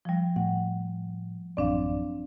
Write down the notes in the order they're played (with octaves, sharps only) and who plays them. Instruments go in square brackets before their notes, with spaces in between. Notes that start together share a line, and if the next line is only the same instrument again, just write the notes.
[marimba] F3 G3
[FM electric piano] A2 [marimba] F#5
[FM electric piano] A1 F#2 D5 [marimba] C4 D4 F5